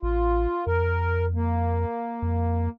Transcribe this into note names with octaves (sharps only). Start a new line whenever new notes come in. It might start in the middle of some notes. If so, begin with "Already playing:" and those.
A1 F4
F2 A#4
A#3
F2